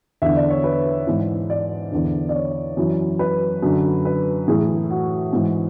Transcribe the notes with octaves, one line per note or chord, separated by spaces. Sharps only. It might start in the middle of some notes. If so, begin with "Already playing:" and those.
E2 D3 E5
D5
C#5
B4
G#2 E3
D5
E2 D3
D5
C#5
F#2 E3
B4
F#2 D3
B4
A2 E3 G#4
F#4
G#2 E3